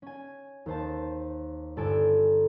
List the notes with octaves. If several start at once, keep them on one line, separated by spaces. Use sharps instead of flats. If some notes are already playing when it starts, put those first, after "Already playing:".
C#4 G#5
D#2 C5 A5
G1 A4 G#5 D7